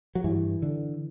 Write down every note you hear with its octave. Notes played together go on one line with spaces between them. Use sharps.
F#3
G2 E3
D3